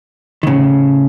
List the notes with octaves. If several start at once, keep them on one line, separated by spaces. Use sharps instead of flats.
D#3
A2 C#3